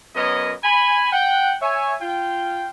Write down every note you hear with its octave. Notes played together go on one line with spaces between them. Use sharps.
F#2 B3 A#4 C#5 D#5
G#5 B5
F#5 G5
C#5 E5 G#5
F4 G5